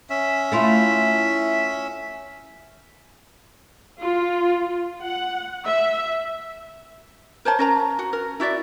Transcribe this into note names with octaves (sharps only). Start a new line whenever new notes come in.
C#4 E5
A3 E4 F4
F4
F#5
E5
A#4 C5 C#5 A5
C#4 A#4 A#5
F#4
A#4
E4 F#4 D5 E5